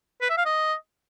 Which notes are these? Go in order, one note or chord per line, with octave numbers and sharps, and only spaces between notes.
B4
E5
F5
D#5